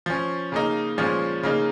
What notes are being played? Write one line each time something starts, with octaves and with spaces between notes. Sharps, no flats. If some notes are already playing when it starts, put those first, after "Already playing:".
F3 C#4
C#3 A#3 D#4
A#2 F3 G#3 C#4
C#3 A#3 D#4